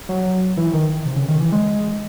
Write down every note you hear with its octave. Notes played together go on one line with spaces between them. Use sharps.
F#3
E3
D#3
C3
C#3
D#3
E3
G#3